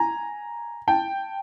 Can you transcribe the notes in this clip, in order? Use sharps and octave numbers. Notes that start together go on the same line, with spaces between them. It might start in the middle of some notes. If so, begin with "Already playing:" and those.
Already playing: G#5 A#5
G5 A5